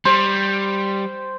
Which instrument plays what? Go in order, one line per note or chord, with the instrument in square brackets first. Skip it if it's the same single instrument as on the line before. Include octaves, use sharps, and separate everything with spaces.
[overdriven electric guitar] G3 [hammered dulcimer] C5